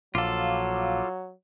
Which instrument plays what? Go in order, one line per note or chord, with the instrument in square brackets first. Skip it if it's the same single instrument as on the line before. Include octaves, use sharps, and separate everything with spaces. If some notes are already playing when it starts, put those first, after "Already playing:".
[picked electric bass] A#1 [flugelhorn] F#3 [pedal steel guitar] F4 A4 [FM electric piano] F5 D6